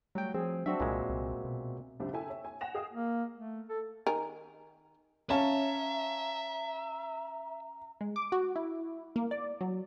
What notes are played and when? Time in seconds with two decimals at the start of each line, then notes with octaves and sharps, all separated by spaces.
0.15 F#3 G3 A3 F#4 G5
0.34 F3 C4 G#4
0.66 F#3 C4 D4 F#4 E5
0.80 C2 A#2 G#3
1.09 C2
1.45 B2
2.00 C#2 F#2 C4 D4 G4 E5
2.13 E4 A4 E5 G5 G#5
2.30 C#5 E5
2.45 G#5
2.61 F#5 G#5 A#6 E7 F7
2.75 G#4 D#5 F5 G5 D#6
2.91 A#3
3.35 A3
3.69 A4
4.07 D#3 A#4 G#5
5.30 C#4 E5 F5 A5 A#5
8.01 G#3
8.16 D6
8.32 F#4
8.56 E4
9.16 A#3
9.31 D5
9.61 F#3